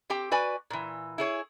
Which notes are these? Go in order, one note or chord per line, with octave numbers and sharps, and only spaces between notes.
C4 G4 G5
F#4 B4 D5 G#5
A#2 E3
E4 G#4 C#5